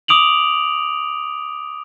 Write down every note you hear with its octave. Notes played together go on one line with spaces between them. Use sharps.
D6 D#6 D7 F7 F#7